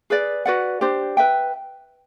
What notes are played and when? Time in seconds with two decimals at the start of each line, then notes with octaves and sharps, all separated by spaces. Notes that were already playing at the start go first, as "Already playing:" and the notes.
0.10 G#4 B4 D5
0.46 F#4 B4 D5 F#5
0.81 D4 G4 C5
1.17 B4 E5 G5